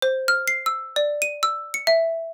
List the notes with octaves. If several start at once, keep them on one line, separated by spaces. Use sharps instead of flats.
C5
F6
C7
E6
D5
D#7
E6
C#7
E5